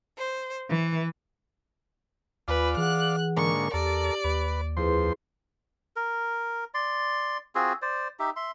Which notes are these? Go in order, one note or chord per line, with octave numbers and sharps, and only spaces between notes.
C5
E3
D#2 F4 B4 D5 F5 G#5 B5
E3 G#4 F#5 F#6
G#2 D3 A#3 A#4 C#6
E2 G4 A4 A#4 D5
D#2 B4
F2 E4 G#4 B4 C5 C6
A#4
D5 C6
C4 F4 F#4 G#4
C5 D5
D#4 G4 E5
E5 C6